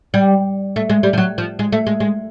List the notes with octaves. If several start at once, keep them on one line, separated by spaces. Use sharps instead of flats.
G3
A3
G#3
G3
F3
F#3
F3
G#3
A3
G#3
G#3